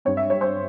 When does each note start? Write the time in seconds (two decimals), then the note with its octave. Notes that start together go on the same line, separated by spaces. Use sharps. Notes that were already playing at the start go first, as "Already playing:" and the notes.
0.05 G2 G3 C4 C#5
0.17 E5
0.30 C#5
0.41 C5